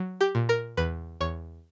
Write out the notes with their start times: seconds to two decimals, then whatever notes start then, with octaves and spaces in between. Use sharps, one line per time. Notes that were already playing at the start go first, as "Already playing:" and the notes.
Already playing: F#3
0.21 G4 G5
0.35 A#2
0.49 A#4 A#5
0.77 E2 B4 B5
1.21 E2 C#5 C#6